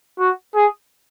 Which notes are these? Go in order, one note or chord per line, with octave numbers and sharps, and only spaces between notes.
F#4
G#4